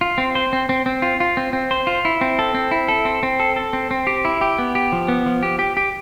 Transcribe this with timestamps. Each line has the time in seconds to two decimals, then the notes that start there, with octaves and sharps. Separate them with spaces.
0.01 F4
0.18 C4
0.35 C5
0.53 C4
0.69 C4
0.86 C4
1.02 F4
1.20 F4
1.37 C4
1.53 C4
1.71 C5
1.87 F4
2.05 E4
2.21 C4
2.39 A4
2.54 C4
2.71 E4
2.88 A4
3.05 C4
3.23 C4
3.40 A4
3.56 A4
3.73 C4
3.91 C4
4.07 G4
4.25 E4
4.41 G4
4.59 B3
4.75 G4
4.92 F3
5.08 B3
5.26 F3
5.43 G4
5.59 G4
5.77 G4